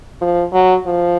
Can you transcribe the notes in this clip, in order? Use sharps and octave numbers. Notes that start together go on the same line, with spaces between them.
F3
F#3
F3